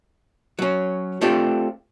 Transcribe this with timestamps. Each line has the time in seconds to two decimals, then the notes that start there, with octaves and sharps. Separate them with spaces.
0.59 F#3 C#4
1.21 A3 C4 D4 F4 G4